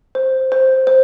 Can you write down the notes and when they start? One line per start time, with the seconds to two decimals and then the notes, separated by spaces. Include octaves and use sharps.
0.15 C5
0.52 C5
0.87 C5